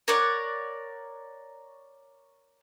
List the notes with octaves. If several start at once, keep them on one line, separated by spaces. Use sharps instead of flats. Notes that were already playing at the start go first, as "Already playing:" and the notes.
A#4 C#5 D5 F#5